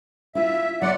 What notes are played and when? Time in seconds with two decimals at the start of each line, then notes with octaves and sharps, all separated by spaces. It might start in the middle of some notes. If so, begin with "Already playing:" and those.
0.35 E4 F4 E5
0.82 F#3 F4 D5 E5 F#5